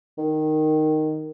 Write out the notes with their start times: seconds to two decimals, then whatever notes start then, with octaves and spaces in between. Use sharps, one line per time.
0.18 D#3